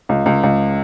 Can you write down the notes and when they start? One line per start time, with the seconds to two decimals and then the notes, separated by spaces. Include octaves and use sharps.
0.09 C#2
0.26 C#2
0.43 C#2